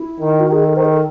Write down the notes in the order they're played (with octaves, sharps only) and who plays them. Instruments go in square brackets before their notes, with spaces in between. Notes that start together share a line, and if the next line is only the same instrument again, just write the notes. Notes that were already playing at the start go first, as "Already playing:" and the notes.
Already playing: [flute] E4
[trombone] D#3
[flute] F#4
[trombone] D#3 [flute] G#4
[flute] A4
[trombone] D#3 [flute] C5
[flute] G#4
A4